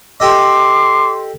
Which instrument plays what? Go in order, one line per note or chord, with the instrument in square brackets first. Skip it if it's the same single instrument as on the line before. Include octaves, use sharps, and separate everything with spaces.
[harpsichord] G4 A4 D#5 [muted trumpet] C6 [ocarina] D6